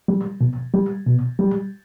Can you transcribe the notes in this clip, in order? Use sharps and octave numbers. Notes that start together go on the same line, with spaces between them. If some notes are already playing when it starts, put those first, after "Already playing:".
G3
B2
G3
B2
G3